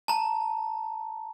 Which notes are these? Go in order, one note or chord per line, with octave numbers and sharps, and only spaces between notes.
A5 A#5